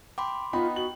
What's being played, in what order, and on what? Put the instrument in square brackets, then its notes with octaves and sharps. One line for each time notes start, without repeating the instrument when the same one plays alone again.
[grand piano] G5 [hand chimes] B5 C6 D6
[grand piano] B3 D#4 [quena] F4 [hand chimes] G5 [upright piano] B5
[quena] F#4 [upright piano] F#7